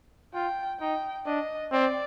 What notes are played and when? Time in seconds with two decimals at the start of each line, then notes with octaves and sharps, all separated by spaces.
0.34 F4 G5
0.80 D#4 G5
1.26 D4 D#5
1.72 C4 D5